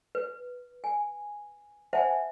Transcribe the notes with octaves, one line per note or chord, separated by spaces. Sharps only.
B4
G#5
C5 E5 F#5 G#5 A5